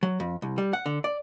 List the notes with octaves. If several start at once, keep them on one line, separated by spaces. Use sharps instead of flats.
F#3
F2
C2
G3
F#5
D3
D5